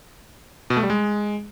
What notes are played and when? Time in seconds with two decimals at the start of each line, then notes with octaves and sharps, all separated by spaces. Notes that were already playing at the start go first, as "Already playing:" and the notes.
0.70 B2
0.77 A3
0.83 G3
0.90 G#3